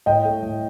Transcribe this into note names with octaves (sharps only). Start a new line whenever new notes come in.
A2 D#5 G5
A3
A2